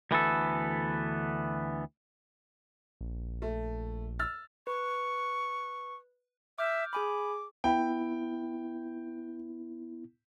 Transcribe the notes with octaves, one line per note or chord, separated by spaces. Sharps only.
D2 E3 B3 A4
A#1
A3
E6 F6 A6
B4 C#6
E5 D6 F6 G6
G#4 G#5 B5 D6
B3 E4 G5